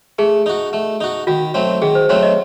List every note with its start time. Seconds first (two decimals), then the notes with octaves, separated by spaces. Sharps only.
0.19 A3 G#4
0.46 D#4 F#4
0.73 A3
1.01 D#4 F#4
1.27 D#3 F#4
1.54 F#3 A3 C4
1.82 D#3 G#4
1.95 C5
2.09 F#3 A3 C4 C#5
2.23 D#5